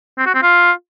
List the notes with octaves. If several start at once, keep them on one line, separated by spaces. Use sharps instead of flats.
C4
F#4
C4
F4